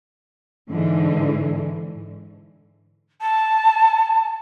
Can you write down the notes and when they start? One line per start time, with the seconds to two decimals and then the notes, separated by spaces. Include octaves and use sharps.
0.70 G#2 D3 E3
3.21 A5